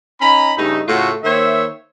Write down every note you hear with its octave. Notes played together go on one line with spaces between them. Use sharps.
C#4 D#4 A#5 B5
G2 C#3 A3 D#4
A2 C#3 A3 F4 F#4
D#3 A#3 C5 C#5 E5